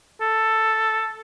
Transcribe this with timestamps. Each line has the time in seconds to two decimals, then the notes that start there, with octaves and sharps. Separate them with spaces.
0.21 A4